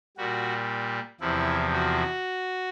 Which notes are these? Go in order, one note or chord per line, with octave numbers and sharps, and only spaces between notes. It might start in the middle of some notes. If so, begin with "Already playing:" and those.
A#2 G3 F#4
E2 C3 F3 E4
F#4